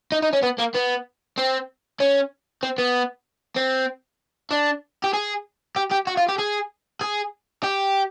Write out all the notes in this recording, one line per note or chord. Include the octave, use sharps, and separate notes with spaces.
D#4
D#4
C#4
B3
A#3
B3
C4
C#4
C4
B3
C4
D4
G4
G#4
G4
G4
F#4
F4
G4
G#4
G#4
G4